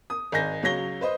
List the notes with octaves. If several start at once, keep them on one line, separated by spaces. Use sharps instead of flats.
D#6
G#1 D#5 G#5 G6 A#6
C#2 F#3 C#5 A#6 G7
B4 C5 D#5